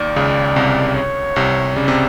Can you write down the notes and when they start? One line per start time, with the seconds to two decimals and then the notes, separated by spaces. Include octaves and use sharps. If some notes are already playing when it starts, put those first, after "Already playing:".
Already playing: D#2 D#3 D5
0.16 C#2 C#3
0.56 C2 C3
0.96 C#5
1.36 C2 C3
1.76 C#3 D5
1.88 C3